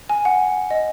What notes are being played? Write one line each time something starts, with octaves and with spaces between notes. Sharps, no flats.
G#5
F#5
D#5